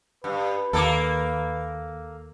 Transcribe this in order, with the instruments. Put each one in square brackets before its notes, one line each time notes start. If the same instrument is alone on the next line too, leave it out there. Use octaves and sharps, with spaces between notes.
[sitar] G2 [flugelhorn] B4
[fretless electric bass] D#2 [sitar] A#3 A4